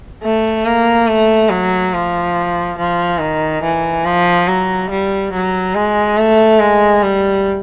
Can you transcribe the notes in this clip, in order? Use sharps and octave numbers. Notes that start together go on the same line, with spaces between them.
A3
A#3
A3
F#3
F3
F3
D#3
E3
F3
F#3
G3
F#3
G#3
A3
G#3
G3